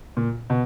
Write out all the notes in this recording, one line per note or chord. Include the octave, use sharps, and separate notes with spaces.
A#2
B2